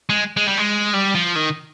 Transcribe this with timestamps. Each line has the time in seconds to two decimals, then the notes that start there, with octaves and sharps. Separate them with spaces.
0.10 G#3
0.37 G#3
0.48 G3
0.58 G#3
0.94 G3
1.15 F3
1.36 D#3